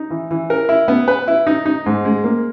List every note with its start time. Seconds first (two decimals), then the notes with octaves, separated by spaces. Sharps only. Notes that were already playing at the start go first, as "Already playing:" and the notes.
Already playing: D#4
0.10 E3
0.31 E3
0.50 A#4
0.69 E4
0.88 B3
1.08 B4
1.28 E4
1.47 D#4
1.66 D#4
1.86 G#2
2.05 G#3
2.24 A#3